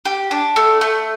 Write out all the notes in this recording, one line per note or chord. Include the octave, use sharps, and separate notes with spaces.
G4
D4
A3
A3